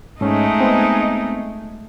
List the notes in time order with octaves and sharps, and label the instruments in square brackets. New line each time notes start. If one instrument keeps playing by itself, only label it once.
[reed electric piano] G#2 C#4 [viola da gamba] G#3 A3 D#4
[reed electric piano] B3 C4